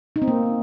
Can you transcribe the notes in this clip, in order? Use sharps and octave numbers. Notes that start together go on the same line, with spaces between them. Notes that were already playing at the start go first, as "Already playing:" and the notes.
D#4
C4
A#3